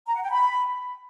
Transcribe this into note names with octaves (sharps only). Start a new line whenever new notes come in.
A#5
F#5
G5
B5